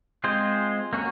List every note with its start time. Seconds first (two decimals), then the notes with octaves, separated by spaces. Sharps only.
0.24 G#3 C4 F4 G#4 C5
0.93 A#3 C#4 F#4